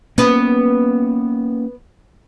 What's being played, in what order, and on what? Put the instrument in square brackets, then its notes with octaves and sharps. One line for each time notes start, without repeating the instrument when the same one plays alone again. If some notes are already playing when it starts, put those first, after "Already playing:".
[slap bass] A#3 C#4 [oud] B3 B4